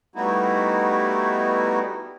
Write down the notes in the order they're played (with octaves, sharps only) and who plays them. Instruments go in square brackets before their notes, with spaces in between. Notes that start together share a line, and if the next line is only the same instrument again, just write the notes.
[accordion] G3 A3 B3 D#4 E4 F#4